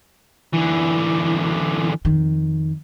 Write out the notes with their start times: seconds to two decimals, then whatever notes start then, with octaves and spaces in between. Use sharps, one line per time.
0.54 D3 E3
2.05 F2 D#3